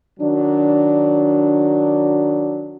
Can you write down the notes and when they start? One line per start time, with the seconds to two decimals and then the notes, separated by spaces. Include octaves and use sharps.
0.20 D#3 F#3 D4